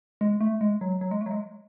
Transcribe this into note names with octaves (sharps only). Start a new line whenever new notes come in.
G#3
A3
G#3
F#3
F#3
G#3
A3
F#3
G#3